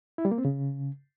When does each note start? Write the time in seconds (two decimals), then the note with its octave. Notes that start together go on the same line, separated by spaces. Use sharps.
0.18 E4
0.25 G3
0.31 A#3
0.38 C4
0.45 C#3